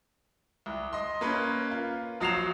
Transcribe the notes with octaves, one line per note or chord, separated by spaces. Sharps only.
C2
D#5 C6
A#3 C#4 B4
F4
A#1 F#3 D#6 C7 E7 F7